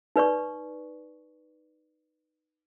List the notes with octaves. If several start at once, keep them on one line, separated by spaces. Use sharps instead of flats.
D#4 B4 D5 C#6